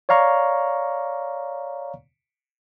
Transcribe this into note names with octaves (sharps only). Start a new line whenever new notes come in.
C#5 D5 F5 A#5 C#6 F6